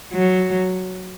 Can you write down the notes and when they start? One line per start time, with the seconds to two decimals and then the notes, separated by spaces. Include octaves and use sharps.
0.13 F#3